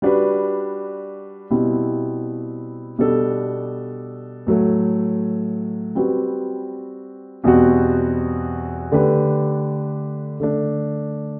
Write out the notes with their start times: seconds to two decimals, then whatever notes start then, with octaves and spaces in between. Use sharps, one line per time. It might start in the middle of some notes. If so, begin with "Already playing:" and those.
0.02 G3 D4 F#4 B4
1.51 B2 G3 C4 E4
2.99 B2 G3 D4 A4
4.47 A2 F#3 A3
5.95 G3 C4 F#4 B4
7.44 E2 B2 G3 C4 F#4
8.92 D3 A3 D4 G4 B4
10.40 D3 A3 D4